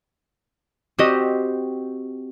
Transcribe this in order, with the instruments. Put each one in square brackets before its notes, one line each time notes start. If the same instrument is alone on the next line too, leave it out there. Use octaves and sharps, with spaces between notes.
[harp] C4 F#4 G4 D#5